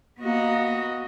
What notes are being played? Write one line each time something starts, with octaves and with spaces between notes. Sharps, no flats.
A#3 B3 F#4 D#5